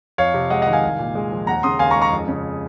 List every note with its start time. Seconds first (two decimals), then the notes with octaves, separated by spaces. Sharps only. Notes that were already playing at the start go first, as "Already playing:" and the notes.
0.18 F2 C#5 F5
0.34 C3
0.50 G#3 D#5 F#5
0.62 D#5 F#5
0.67 D#3
0.73 F5 G#5
0.83 C2
0.99 A#2
1.15 G#3
1.32 F3
1.47 D#2 F#5 A#5
1.63 C#3 C6 D#6
1.79 D#2 F5 G#5
1.91 A#5 C#6
1.96 G#3
2.02 A#5 C#6
2.12 F2
2.28 C#3